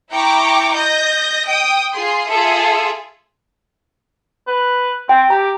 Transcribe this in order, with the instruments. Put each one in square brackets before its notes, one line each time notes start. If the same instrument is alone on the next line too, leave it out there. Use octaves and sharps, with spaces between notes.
[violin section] E4 G5 A#5 C#6 D6
D#5 G6 A#6
G5 D#6 D7
F4 G#4 C6
F4 G#4 A4 E5
[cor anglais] B4
[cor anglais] C4 [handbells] G5
[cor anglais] G4 [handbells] A#5